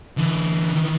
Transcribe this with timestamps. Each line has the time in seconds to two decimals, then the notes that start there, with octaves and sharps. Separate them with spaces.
0.17 D3 E3
0.73 D#3 E3